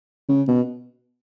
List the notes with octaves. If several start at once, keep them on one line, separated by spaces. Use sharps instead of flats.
C#3
B2